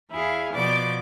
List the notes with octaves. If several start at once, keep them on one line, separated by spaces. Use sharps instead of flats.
E2 E4 G#4 F5
B2 F3 B3 D5 D6